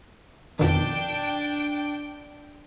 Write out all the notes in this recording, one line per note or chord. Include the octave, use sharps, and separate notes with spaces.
F2 B2 D#3 D4 G5